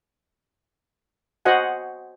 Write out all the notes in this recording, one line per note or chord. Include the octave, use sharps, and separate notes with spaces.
F#4 C5 D#5 F#5 G#5